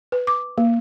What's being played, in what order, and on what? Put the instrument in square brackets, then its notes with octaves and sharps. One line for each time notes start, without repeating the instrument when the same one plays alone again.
[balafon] B4
D6
A#3